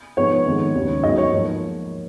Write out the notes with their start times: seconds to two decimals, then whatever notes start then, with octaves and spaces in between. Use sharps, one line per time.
0.17 G#2 F3 B3 C#5
0.45 F2 D#3 G#3 B3
0.75 D#2 C#3 G#3
1.03 G#2 F#3 B3 D#5
1.18 C#5
1.33 G#2 F3 A#3